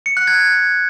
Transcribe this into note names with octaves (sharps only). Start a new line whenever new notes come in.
C#7
F#6
G#6